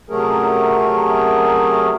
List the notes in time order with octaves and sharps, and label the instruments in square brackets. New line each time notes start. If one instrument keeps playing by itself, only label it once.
[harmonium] C3 F#3 A3 C#4 G#4 A#4